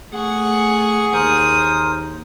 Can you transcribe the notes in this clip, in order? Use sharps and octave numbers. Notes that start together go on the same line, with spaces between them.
A3 G#4 F#5 C#6
D#2 A#4 C5 D#6